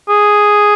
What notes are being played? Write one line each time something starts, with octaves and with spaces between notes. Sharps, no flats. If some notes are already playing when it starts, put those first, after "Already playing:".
G#4